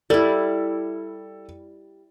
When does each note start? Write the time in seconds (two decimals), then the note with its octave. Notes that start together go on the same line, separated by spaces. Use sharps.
0.10 G3 E4 A4